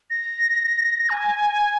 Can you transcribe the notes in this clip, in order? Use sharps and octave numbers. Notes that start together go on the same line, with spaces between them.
A#6
G#5